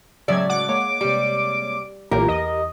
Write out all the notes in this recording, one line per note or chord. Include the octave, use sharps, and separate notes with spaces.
A2 C#3 F#3 G#3 D5 E5 G#6
F#5 D6
G#3 A#3 C#5
C3 G3 D7
B1 A#2 E3 A#3 G4 A#4
E2 D#5